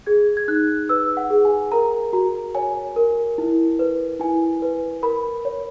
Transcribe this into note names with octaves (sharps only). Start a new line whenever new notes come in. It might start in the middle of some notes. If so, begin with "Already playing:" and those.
G#4 G#6
G#6
D#4 F#6
B4 E6
F#5
G#4
G#5
A#4 A#5
F#4 A#5
C#5 G#5
A#4
E4
B4
E4 G#5
B4
A#4 B5
C#5